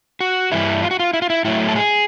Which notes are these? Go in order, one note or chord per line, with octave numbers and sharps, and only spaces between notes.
F#4
G2 E3 G3 E4
F4
F#4
F4
E4
F4
E4
A2 F#3 A3 E4
A4
G#4